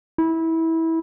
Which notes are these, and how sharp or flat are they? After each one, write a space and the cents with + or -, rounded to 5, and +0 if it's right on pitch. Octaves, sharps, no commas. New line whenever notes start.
E4 -20